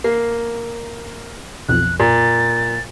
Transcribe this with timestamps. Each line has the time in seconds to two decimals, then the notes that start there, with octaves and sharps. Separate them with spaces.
0.04 A#3 C7
1.69 B1 F2 F#6
2.00 A#2 A6